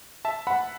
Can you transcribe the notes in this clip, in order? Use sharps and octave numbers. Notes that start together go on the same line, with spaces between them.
E5 A5
F#5 B5